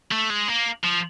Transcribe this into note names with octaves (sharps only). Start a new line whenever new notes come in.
A3
G#3
A#3
F3